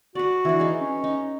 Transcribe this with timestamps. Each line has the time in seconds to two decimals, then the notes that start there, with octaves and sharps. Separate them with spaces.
0.15 F#4 B4 D5
0.45 E3 D4
0.60 D#4 G#4
0.80 C#4
1.04 D#4